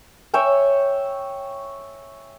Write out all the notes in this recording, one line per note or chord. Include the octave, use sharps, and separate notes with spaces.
C#5 E5 G5 G#5